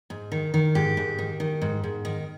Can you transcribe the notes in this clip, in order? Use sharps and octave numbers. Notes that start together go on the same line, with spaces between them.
G#2
D#3
D#3
G#2 G4
G#2
D#3
D#3
G#2
G#2
D#3